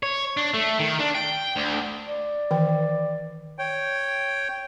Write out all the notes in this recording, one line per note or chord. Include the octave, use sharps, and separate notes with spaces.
C#5
D4
A3
D#3
D4
G5
D2
D5
D#3 E3 G5
C#5 G5